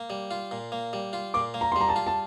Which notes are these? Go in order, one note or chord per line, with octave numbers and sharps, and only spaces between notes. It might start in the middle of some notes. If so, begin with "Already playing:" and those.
Already playing: A#3
G3
F4
A#2
A#3
G3
F4
A#2 D6
A#3
A#5
C6
G3 A#5
A5
F4
A5